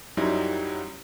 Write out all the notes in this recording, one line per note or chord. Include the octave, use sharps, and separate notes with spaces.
F#2 F#3 G3 D#4 E4